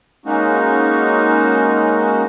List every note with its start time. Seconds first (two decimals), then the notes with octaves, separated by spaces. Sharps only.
0.26 G#3 A#3 C#4 D#4 F#4